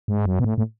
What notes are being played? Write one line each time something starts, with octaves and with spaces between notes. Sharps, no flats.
G#2
F#2
B2
A2
A2